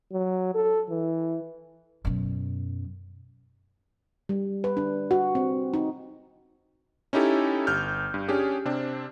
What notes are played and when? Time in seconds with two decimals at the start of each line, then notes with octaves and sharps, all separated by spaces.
0.12 F#3
0.55 A4
0.90 E3
2.05 F#2 B2
4.29 G3
4.64 B4
4.77 D4
5.11 F#4
5.35 C4
5.74 D#4
7.13 C#4 D#4 E4 G4 A4
7.67 G1 F6 G6
8.14 G2
8.28 C#4 D4 G4 G#4
8.65 C3 C4 D4